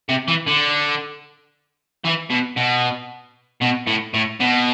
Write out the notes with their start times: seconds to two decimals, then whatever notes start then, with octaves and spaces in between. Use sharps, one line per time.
0.09 C3
0.28 E3
0.48 D3
2.05 E3
2.30 B2
2.57 B2
3.62 B2
3.87 A2
4.14 A2
4.40 B2